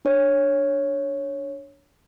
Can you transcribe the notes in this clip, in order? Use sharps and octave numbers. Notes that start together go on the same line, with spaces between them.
D4 C#5